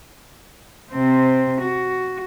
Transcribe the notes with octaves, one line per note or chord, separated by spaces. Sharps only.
C3 C4
F#4